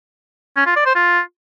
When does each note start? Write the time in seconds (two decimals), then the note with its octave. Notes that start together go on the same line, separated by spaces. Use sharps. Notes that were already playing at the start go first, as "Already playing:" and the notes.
0.57 C#4
0.66 F4
0.76 D5
0.86 C5
0.95 F4